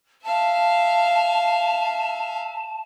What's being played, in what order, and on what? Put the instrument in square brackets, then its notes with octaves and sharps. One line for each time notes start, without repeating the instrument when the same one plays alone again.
[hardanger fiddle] E5 F5 [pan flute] A5